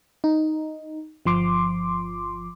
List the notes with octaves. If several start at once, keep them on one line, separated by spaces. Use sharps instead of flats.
D#4
G1 F3 C6 D6